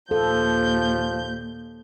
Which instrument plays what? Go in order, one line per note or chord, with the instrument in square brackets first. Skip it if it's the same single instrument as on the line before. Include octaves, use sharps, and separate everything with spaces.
[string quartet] D#2 A#2 G6 [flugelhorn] F3 [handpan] A4